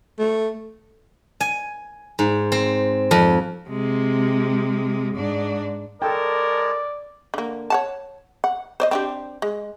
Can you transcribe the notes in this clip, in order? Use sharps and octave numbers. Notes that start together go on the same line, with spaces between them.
A3
G#5
G#2
C4
F2
C3 G#3
G#2 D4
G#3 A4 A#4 C#5 D5 G5 A5
D3 A#3
C#5 F#5 A5
F#5
C5 D5 D#5
C4 D4 G4
G#3